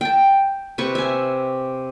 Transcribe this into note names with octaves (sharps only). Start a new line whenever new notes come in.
G5 A5
C3 B4 C#6
E5 G#5